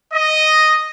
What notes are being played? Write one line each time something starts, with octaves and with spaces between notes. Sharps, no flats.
D#5